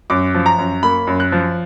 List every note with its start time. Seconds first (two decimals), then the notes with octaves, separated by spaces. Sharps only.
0.10 F#2 D6
0.35 F3
0.46 A#5
0.58 F#2
0.83 A#3 B5
1.07 F#2
1.20 F#6
1.32 F3